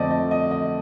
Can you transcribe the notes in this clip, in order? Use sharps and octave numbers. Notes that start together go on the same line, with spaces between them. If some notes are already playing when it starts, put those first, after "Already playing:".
Already playing: F2 D3 A3 C4 D5 D#5
D#5
D#5
D#5